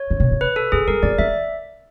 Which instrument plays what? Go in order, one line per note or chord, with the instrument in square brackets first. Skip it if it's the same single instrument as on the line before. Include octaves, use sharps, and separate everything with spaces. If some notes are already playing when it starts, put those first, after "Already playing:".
Already playing: [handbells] C#5
[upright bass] D3
C3
C3
[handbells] B4
A4
[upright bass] C#3 [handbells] G#4
[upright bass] G3 [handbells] A#4
[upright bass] F#3 [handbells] D5
[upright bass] F#3 [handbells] E5